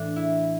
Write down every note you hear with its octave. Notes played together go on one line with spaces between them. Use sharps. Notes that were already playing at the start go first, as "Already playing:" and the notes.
Already playing: A2 E3 D4
E4